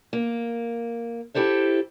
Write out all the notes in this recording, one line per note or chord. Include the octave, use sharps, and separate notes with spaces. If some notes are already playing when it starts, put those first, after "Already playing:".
A#3
E4 G4 A4 C5 E5